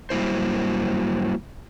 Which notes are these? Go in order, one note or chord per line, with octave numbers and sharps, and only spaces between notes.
F#3 G3 A#3 E4 C5